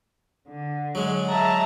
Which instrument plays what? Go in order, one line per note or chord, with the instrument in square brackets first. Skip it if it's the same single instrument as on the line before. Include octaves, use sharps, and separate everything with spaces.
[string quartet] D3
[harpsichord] F#3 G#3
[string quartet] E5 A5 A#5